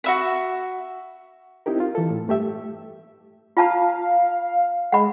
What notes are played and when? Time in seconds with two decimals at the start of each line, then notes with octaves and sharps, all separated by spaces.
0.04 F#4 E5 B5
1.66 C4 D#4 E4 G4 A#4
1.80 F4
1.95 E3 A4
2.10 A2
2.28 G2 A3 G4 E5
3.57 F4 F5 A5 A#5
4.92 G#3 F#5 B5